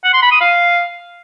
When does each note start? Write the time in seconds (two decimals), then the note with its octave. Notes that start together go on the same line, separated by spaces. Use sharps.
0.04 F#5
0.13 C6
0.23 B5
0.32 D#6
0.41 F5